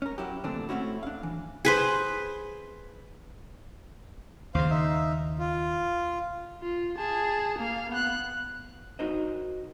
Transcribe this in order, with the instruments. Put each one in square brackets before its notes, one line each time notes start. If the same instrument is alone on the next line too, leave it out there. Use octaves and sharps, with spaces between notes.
[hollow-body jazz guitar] C#4 A#4
F#3 E4 G4
A#2 D3 E3 A3 C4 D4
A3 C4 C#4 E4 F#4
D4 F5
E3
[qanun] G#4 B4 C5
[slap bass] D#2 C#3 [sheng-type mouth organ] C5 F5
[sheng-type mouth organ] D#4 E5
F4
[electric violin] F4
G#4 A5
A#3 F5
B3 F#6
[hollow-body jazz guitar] D#4 F#4 A#4 C5 D#5